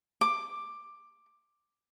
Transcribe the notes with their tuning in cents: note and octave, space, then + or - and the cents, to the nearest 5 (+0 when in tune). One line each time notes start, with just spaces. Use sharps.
D6 +10